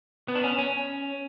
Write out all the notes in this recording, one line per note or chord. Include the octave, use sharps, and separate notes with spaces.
B3
D4
C#4
C#4